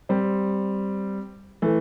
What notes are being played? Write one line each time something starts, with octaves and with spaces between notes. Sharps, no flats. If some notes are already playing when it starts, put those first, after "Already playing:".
G3 C4
E3 A3